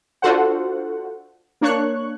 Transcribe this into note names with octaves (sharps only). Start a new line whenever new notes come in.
D4 F4 F#4 A4 C5 F#5
A#3 D4 C#5 C#6 F#6